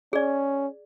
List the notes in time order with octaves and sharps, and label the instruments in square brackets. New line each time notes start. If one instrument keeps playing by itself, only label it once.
[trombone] C#4 [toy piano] G#4 D5